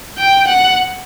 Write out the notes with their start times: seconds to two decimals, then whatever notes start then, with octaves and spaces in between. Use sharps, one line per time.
0.18 G5
0.47 F#5